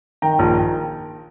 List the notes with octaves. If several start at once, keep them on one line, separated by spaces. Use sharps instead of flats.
D#3 G5 A#5
A#1